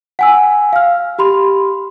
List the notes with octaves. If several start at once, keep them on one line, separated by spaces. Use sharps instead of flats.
F#5 G#5 E6
F5 F6
G4 B5 C6